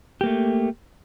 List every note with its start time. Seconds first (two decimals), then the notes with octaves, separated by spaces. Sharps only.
0.21 G4
0.24 A#3
0.26 A3